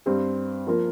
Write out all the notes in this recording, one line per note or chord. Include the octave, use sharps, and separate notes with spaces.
G2 G3 C4
F3 A#3 F4 A#4